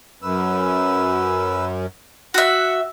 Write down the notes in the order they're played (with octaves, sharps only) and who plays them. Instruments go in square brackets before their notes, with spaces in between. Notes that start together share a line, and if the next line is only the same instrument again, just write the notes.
[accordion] F#2 [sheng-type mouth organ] B4 E6
[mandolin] F#4 E5 [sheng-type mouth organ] F#5